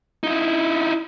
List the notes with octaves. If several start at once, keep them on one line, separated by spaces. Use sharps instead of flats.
D#4 E4